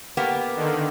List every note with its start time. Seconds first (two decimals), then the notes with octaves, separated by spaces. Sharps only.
0.17 A#3 B3 G4
0.56 D3 D#3